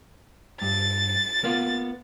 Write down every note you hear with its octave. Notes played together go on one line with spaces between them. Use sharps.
G2 A6
A#3 B3 F4